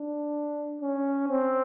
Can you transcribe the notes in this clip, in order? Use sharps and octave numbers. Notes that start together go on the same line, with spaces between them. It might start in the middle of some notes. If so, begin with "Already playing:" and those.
Already playing: D4
C#4
C4